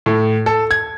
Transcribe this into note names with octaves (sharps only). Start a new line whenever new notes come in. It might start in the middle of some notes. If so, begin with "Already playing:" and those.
A2
A4
G#6